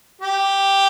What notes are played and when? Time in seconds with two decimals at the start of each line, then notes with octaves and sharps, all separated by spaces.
0.22 G4